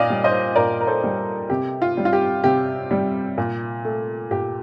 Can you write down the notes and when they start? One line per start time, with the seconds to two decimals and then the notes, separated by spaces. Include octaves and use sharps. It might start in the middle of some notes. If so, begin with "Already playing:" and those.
Already playing: A#2 D5 D#5 F5
0.10 G3
0.24 C5 D#5
0.55 A#2 A#4 D5
0.81 A#4
0.87 A4 C5
1.03 G3
1.50 C3 G4
1.82 F4
1.97 G3
2.05 F4
2.13 G4
2.44 C3 G4
2.91 G3
3.38 A#2
3.85 A3
4.31 A#2 G4